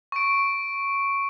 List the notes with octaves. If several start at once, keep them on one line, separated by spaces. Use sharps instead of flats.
C#6 D7